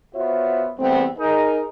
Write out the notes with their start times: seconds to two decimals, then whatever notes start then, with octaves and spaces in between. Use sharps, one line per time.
0.15 B3 F4 F#4 C5 C#5 E5
0.79 E2 G3 A3 B3 C4
1.18 D#4 G#4 A#4